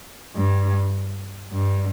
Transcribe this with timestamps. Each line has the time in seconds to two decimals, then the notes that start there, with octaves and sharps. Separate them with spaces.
0.36 G2
1.53 G2